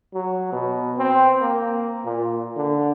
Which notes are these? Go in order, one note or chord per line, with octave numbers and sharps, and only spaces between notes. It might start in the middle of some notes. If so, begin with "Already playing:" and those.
F#3
B2
C4
A#3
A#2
D3